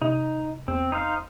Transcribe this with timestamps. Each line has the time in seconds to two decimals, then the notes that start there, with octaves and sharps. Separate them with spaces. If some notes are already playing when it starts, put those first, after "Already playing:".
0.02 C3 D#4
0.68 E2 C4
0.92 D#4 C5 F5